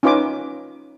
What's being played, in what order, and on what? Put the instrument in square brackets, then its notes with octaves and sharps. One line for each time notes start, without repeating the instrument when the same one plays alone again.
[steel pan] C#4 D#4 F4 B4 G#5 D6